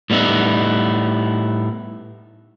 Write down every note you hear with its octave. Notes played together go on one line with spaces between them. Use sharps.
A2 G3 B3 D#4 E4